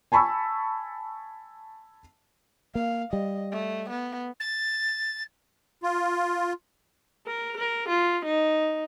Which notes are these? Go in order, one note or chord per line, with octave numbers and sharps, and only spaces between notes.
G#5 A5 B5 C#6 E6
A#3 F5
G3 D#5
A3
B3
A6
F4
A#4
A#4
F4
D#4